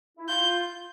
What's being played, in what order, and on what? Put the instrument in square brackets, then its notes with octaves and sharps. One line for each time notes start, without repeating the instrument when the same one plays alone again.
[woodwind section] E4
[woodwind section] F4 [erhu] G6